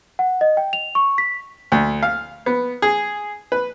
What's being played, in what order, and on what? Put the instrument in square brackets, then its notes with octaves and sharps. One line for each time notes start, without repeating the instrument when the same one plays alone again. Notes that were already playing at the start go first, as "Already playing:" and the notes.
[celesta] F#5
D#5
G5
F7
C#6
B6
[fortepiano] D2
F5
B3
G#4
B4